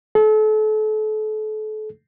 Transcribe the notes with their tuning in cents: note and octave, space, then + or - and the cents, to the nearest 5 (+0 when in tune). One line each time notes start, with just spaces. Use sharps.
A4 -35